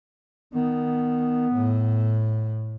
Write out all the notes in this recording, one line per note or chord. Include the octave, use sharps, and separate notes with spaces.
D#3 B3
A2